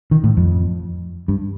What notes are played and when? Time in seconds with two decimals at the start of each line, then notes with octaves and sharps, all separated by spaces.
0.11 D#3
0.24 A2
0.37 F2
1.28 G2